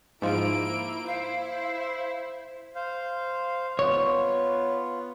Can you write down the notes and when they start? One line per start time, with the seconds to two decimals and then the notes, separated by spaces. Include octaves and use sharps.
0.22 G#2 F3 A#3 E4 D7
1.06 E4 C5 F5
2.75 C5 F5
3.79 B3 F4 C#5